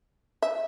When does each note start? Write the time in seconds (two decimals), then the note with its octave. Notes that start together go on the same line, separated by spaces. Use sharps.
0.42 E5